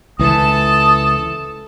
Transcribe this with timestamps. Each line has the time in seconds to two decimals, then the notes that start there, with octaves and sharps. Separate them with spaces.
0.19 C#2 E3 A4 A5 D#6